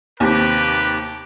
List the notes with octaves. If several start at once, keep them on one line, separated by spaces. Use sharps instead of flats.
D#2 C3 G4 B4